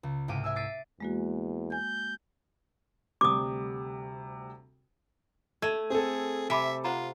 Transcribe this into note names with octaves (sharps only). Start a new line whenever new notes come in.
C#2
C2 G#2 G4 F5 D6 D#7
E5 G#5 E6
D6 A6 B6 C7 D7 D#7
E2 G#3 A#3 F#4
G#5 G6
D2 C3 G3 D6 D#6
A3 G#6 D#7
C4 G#4 A4
C3 E5 G#5 B5 D6
F4 C5 F#5 A#5